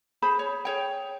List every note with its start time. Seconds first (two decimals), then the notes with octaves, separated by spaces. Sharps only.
0.22 G#4 C5 B5
0.39 C#5
0.65 G#4 C#5 G5